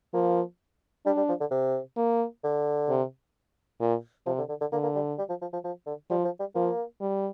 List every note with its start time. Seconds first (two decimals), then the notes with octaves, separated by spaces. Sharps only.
0.13 F3 A#3
1.05 G3 D4
1.16 G3
1.28 F3
1.40 D3
1.51 C3
1.97 A#3
2.43 D3
2.89 C3
3.80 A#2
4.26 C3 F3
4.38 D3
4.49 D3
4.61 D3
4.72 D3 A#3
4.83 A#3
4.95 G3
5.18 G3
5.29 F3
5.41 F3
5.53 F3
5.64 F3
5.86 D3
6.10 F3 G3
6.24 F3
6.39 G3
6.55 F3 A#3
7.01 G3